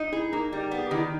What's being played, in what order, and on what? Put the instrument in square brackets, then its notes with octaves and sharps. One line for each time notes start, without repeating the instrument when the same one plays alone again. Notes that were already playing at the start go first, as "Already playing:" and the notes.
Already playing: [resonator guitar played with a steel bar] D#4
[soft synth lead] E4 [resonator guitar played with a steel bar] G#4
[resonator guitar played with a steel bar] A#3 [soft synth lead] D#4
[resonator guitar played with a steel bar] G3 [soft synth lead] D#4
[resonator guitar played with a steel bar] B3
[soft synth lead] G#4
G4
[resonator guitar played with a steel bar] D#3 [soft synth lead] E4
[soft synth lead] D#4